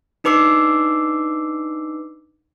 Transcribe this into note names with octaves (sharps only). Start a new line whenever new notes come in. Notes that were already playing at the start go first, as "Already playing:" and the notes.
D4 D#4 B4 D6 E6 C7